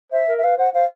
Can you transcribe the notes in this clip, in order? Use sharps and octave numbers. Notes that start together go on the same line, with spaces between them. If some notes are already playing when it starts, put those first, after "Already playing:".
C5 E5
A#4
E5
B4 F5
C5 F#5
C5 F5